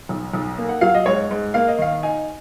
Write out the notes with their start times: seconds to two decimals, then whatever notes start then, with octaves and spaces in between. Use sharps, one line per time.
0.09 B1
0.34 B1
0.58 A#3
0.69 F#5
0.81 F#3 F5
0.95 D#5
1.06 G#2 C#5
1.31 G#2
1.54 A#3 F5
1.68 D#5
1.79 D#3 F5
2.03 D#4 G#5